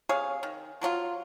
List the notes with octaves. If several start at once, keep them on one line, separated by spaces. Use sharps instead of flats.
C3 G#4 C#5 F5
D#3
F3 F#3 D4 F4